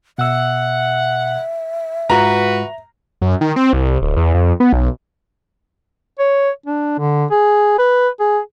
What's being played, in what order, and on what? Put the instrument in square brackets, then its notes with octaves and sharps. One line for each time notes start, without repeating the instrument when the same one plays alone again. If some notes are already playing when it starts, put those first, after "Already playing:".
[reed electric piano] B2 E6 [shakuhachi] E5 [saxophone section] F#5
[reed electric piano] G#2 G#3 F4 [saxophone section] F#4 B4 [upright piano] A#5
[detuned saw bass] F#2
D#3
C4
C2
D1
E2
F2
B3
B1
[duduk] C#5
D4
D3
G#4
B4
G#4